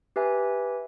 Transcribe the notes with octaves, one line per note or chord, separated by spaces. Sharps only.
G4 B4 E5 G#5